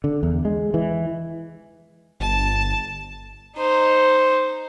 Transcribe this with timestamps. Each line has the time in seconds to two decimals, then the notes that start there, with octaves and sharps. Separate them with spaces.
0.04 D3
0.23 E2
0.45 G#3
0.74 E3
2.20 G1 A5
3.56 D#4 C5